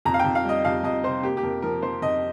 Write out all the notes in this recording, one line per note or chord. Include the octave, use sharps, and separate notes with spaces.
F2 A#5
F5
F2 G5
F5
G3 D#5
F2 F5
F2 D#5
C3 C5
A#3 G4
G4
F2 A#4
F3 A#4
F3 C5
F2 D#5